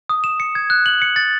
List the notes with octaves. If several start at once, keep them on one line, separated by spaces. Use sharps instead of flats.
D#6
E7
C#7
G#6
F#6
F#7
C#7
A6